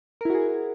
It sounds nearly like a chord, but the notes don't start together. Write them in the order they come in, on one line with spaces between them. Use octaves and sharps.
A#4 E4 F#4 G#4